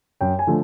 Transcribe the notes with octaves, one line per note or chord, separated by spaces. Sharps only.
F#2 G5
G#5
D3 F3 A3